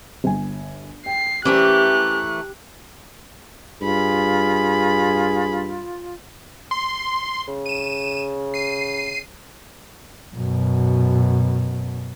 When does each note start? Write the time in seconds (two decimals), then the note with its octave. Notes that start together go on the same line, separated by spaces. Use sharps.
0.24 G1 G#5
1.06 G5 C7
1.45 E3 A3 C#4 G4 A#4 C5 F#6
3.82 G2 F4 G#4 B5
6.71 C6
7.48 C#3
7.66 D#7 E7
8.54 C7 D#7
10.35 F#2 B2